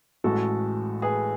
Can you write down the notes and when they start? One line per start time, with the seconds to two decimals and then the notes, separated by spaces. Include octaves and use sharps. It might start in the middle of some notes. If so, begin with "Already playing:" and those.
0.24 A1 A2 G#3 F#4 A4
1.02 G#4 B4